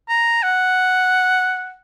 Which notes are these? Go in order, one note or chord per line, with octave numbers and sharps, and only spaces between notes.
A#5
F#5